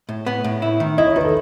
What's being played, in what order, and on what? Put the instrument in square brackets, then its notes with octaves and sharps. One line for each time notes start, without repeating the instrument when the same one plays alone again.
[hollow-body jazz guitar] A2
B3
A2
E4
D#3
[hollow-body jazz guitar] E4 [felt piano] D#5
[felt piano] C#5
[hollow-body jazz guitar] D#3 [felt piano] B4
[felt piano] A4